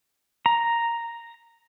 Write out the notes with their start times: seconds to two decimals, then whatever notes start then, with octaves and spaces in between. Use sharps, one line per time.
0.46 A#5